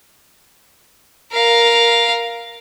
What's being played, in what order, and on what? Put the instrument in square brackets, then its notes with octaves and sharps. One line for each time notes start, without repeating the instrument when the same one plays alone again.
[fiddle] A#4 F5